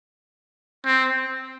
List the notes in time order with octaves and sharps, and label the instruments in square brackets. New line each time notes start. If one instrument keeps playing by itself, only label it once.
[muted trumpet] C4